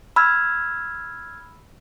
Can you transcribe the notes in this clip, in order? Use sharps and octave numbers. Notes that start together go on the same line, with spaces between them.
B5 E6 F6 G#6